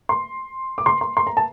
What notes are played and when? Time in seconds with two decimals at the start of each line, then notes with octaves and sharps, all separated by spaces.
0.09 C6
0.78 D6
0.86 C6
1.01 C6
1.17 C6
1.27 A#5
1.37 A5